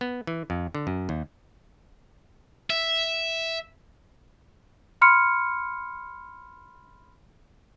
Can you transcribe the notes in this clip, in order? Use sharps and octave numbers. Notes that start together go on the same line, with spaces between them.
B3
E3
F2
D3
F#2
D#2
E5
B5 C6 F6 C#7